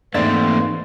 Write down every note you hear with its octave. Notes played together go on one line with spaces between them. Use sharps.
G#2 E3 A3 A#3 C4 D5 E5 A6